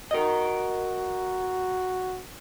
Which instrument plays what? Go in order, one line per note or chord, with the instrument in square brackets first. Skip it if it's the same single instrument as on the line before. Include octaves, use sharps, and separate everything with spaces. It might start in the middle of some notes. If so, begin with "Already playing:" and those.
[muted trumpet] F#4 [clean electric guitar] A#4 D#5